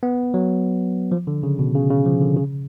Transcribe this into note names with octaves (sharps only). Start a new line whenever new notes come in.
B3
F#3
F3
D3
C#3
B2
C#3
C#3
F3
D3
C#3